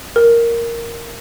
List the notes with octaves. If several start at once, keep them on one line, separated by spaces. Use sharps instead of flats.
A#4